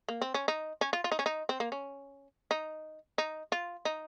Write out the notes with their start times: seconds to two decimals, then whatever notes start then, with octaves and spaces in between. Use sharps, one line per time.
0.08 A#3
0.21 C4
0.34 C#4
0.48 D#4
0.81 C#4
0.93 F4
1.04 F4
1.12 D#4
1.19 C#4
1.26 D#4
1.49 C4
1.60 A#3
1.72 C#4
2.51 D#4
3.18 D#4
3.52 F4
3.85 D#4